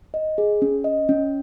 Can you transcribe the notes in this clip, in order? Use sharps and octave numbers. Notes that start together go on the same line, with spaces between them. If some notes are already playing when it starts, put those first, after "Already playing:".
D#5
G#4
C#4
D#5
C#4